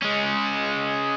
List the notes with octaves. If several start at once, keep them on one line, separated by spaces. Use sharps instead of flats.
G#3 C#4